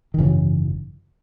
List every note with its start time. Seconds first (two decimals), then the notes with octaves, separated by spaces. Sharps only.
0.14 D#3
0.18 G#1 F#2 C#3 E3